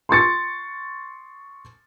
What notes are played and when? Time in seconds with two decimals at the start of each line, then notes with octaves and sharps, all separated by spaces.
0.09 C6 C#6 A6 C#7